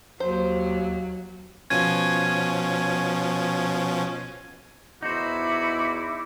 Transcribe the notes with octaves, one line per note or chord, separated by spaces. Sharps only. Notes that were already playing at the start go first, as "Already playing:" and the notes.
D#2 F#3 C5
B2 F3 C#4 G#6 D#7
E2 D#4 E4 F#4 C5 D6